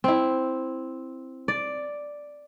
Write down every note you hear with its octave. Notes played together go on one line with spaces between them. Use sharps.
C4 E4
D5